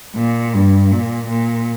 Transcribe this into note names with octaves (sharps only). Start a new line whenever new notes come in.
A#2
G2
A#2
A#2